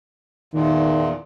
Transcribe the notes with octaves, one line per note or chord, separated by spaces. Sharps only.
E2 A#2 D#3